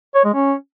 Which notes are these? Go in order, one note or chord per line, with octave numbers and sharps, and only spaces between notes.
C#5
G#3
C#4